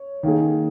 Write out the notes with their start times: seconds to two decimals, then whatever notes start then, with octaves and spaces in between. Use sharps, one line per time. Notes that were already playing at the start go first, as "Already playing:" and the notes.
Already playing: C#5
0.23 D#3 A#3 D#4 G#4